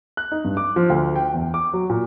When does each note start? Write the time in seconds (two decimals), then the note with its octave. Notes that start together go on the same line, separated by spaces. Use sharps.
0.17 F#6
0.32 D#4
0.45 G2
0.57 D6
0.76 F3
0.90 D2
1.16 G5
1.33 E2
1.54 D6
1.73 F#3
1.90 A#2